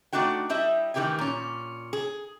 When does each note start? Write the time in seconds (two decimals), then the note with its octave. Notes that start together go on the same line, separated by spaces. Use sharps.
0.13 A3 C4 D4 D#4 F#4 G5
0.49 G3 E4 G4 D#5 E5
0.94 A2 D#3 E3 G4 G5 G#5
1.19 A#2 C#4
1.93 G#4